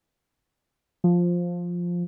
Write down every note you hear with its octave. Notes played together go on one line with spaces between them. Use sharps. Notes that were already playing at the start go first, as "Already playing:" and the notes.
F3